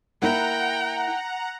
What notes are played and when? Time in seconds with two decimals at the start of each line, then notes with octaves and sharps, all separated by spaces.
0.22 A#3 E4 F#5 G5 A#5